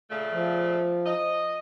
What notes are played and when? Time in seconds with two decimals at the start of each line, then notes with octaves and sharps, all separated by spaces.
0.10 A#2 C#3 A3
0.33 F3
1.06 D#5